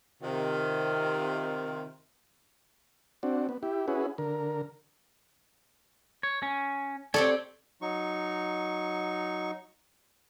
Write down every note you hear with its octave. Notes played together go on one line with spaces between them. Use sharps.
C3 D#3 F4
C4 D4 F#4
B3
E4 G4
C#4 E4 F#4 G#4 B4
D3 A#4
C#5
C#4
C4 G4 A4 C#5 D5
F#3 D#4 C#6